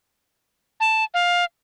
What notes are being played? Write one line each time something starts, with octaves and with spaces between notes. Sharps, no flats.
A5
F5